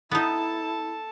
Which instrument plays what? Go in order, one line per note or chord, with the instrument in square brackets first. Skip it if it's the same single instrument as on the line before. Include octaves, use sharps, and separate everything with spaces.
[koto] B3 D#4 [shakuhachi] E4 [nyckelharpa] A4 A5